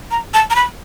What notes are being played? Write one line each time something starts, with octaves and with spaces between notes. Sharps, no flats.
A#5
A5
A#5
B5